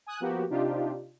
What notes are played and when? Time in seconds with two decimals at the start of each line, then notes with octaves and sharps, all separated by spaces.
0.07 G#5 D#6 F#6
0.20 F3 A#3 B3 F#4 G4
0.50 C3 D4 D#4 F4 G4